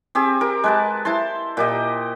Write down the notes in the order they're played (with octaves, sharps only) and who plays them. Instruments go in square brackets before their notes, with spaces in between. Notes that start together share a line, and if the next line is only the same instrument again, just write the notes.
[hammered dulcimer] C4 G4 G#4
G4 A#4
G#3 B4 A5
E4 C5 A5 C6
A#2 G4 D#5